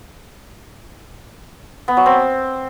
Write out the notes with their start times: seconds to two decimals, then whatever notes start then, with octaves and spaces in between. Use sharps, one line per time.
1.88 B3
1.97 F#3
2.06 C4